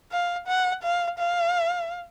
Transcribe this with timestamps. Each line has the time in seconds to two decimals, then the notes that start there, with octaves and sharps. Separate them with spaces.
0.11 F5
0.47 F#5
0.83 F5
1.18 F5